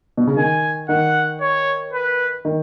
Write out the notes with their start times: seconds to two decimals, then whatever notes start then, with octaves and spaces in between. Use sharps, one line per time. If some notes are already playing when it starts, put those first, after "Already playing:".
0.17 B2
0.27 C#3
0.37 D#3 G#5
0.89 D#3 F#5
1.41 C#5
1.93 B4
2.45 D#3